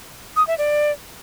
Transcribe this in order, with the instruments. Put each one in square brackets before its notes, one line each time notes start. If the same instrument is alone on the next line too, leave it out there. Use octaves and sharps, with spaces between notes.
[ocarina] D#6
E5
D5